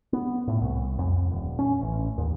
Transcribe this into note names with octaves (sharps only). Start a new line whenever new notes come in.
B3
A2
C2
F2
D#1
C#4
A1
D#2